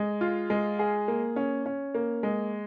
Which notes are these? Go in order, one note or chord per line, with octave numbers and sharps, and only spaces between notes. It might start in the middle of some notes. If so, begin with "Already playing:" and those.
Already playing: G#3
F4
G#3
G#4
A#3
C#4
C#4
A#3
G#3